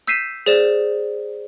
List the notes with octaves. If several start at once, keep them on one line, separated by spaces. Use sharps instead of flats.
E6 G6 B6 C7 D#7 E7
G#4 C5 D5 E7